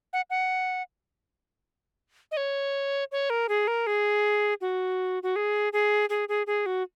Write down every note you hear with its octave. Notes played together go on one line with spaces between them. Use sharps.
F#5
F#5
D#5
C#5
C#5
A#4
G#4
A#4
G#4
F#4
F#4
G#4
G#4
G#4
G#4
G#4
F#4